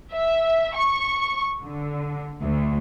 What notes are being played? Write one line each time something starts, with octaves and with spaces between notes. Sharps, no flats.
E5
C#6
D3
D2